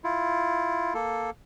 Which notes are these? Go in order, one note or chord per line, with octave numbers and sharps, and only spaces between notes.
E4 F4
A#3 A4